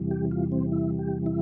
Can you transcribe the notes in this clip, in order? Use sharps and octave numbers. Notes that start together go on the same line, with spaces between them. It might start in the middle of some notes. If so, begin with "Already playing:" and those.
Already playing: E2 C3 E3 G3
G4
F4
C4
E4
G4
E4